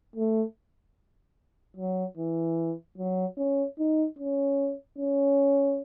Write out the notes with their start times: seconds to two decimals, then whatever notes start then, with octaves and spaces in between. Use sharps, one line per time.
0.16 A3
1.77 F#3
2.18 E3
2.98 F#3
3.38 C#4
3.79 D#4
4.19 C#4
4.99 C#4